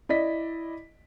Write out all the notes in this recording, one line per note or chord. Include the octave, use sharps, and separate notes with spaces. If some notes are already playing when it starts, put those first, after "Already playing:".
E4 D5 D#5 B6